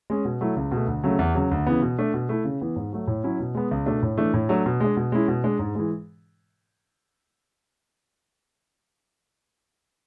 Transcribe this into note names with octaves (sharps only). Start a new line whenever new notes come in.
G#3 C#4
B2
F#3 A3 E4
C#2
B2
A3
D2
C#3 F#3 A3
E2
C#3 F#3
D2
C#3 E3 B3
B2
A3 D4
B2
A3 E4
C#3
E3 B3
G#2
F#3 A3
A2
F#3 C#4 E4
B2
G#3 B3
C#2
B2 A3 D4
A2
E3 A3 D4
A2
F#3 A3 D4
B2
G#3 D4
B2
G#3 C#4 E4
B2
G#3 D4
G#2
E3 G#3